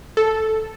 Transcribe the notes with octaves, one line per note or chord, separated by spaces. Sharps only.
A4